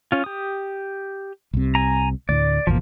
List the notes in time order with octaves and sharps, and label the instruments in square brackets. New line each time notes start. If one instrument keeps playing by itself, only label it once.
[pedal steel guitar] C#4 F4
G4 D#6
[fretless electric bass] C2 C3
[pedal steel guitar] G#5 A#5
[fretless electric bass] D2 A2 [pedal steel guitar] D5
[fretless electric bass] G#1 E2 B2 [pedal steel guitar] F3 A#3